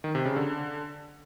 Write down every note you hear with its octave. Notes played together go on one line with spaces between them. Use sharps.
D#3
C3
C#3
D3